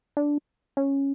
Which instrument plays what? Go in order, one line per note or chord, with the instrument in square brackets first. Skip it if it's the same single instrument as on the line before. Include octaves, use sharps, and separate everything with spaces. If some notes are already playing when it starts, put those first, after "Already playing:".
[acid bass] D4
C#4